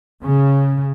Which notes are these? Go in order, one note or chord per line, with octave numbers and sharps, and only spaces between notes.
C#3